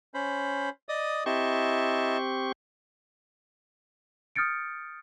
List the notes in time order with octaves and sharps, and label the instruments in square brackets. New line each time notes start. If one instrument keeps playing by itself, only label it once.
[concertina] C#4 C5 B5
D5 D#5 D#6
[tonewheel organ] C4 G4 C#6 [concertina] E4 D#5 A5
[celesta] D#6 F6 G6 A6 C#7 D7